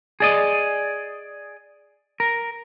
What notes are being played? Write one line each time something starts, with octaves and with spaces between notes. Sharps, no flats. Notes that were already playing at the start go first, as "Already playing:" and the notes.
G#4 D5 D#5
A#4